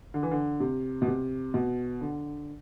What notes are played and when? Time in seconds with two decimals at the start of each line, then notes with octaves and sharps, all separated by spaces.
0.14 D3
0.23 E3
0.31 D3
0.60 C3
1.02 B2
1.08 C3
1.54 B2
2.01 D3